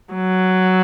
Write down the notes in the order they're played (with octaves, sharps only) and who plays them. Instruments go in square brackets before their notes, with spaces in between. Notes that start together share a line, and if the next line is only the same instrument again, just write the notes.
[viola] F#3